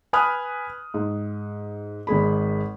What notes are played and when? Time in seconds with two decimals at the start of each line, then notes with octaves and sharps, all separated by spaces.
0.13 B4 G#5 B5 D#6 F6 F#6
0.94 G#2
2.07 G#1 G#3 G#4 B5